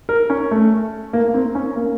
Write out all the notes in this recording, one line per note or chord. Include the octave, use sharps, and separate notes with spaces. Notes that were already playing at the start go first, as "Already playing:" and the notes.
A#4
C#4
A3
A#3
A#3
C4
C#4
A#3